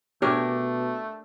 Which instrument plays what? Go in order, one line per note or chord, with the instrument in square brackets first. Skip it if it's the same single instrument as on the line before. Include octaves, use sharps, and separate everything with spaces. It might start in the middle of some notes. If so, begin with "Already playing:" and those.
[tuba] B2 [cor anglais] A3 [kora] D4 A#4 [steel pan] G4 C#5